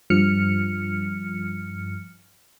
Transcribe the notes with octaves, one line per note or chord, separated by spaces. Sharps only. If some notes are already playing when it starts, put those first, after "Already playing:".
G2 F3 F6 C#7